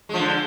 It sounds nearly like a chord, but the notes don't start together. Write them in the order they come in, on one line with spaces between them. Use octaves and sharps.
G#3 F3 D3